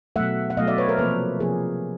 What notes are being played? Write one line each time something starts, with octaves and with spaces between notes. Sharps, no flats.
B2 F#3 A3 E5 F#5
F#5
B2 F#3 A3 D#5 F5
D5 E5
B4 C#5
A#4 C5
C3 F3 A#3 A4 B4
C3 F3 A#3 G#4 A#4